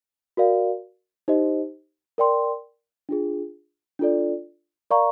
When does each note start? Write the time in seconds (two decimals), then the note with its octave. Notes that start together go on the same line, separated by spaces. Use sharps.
0.37 F#4 A#4 D5 F5
1.28 D#4 G4 C5 D#5
2.18 A#4 D5 G5 C6
3.09 D4 F4 G#4
3.99 D4 F4 A4 D5
4.91 A#4 D5 F5 A#5 C#6